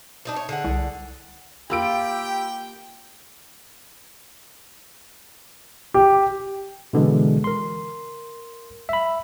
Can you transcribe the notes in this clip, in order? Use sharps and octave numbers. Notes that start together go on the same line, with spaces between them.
D4 D#4 D5
C#5
D3 G#4 F#5
C2
A#3 F4 G4 G5 B5 E6 D7
G4
B2 D3 E3 G#3
A#4 C6
E5 B5